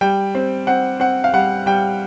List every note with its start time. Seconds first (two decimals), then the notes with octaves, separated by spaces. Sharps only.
0.01 G3 G5
0.35 C4
0.67 C4 F#5
1.00 C4 F#5
1.24 F5
1.33 G3 F#5
1.66 G3 G5